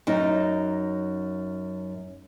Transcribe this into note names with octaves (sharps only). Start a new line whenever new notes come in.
F#2 D#4